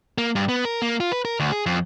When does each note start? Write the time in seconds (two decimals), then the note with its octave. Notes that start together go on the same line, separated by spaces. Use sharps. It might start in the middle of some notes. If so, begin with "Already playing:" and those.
0.18 A#3
0.35 G2
0.49 B3
0.65 A#4
0.82 A#3
1.00 F4
1.12 B4
1.25 A#4
1.40 D2
1.52 G#4
1.66 F2